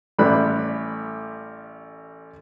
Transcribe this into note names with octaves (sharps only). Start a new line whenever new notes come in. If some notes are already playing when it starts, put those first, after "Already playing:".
A1 G3 A3 D5 B5 F#6